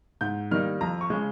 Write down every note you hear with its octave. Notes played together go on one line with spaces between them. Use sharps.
G#2 G6
D#3 G3 A#3 D#4 F6
F2 A#5
C#6
C#3 G#3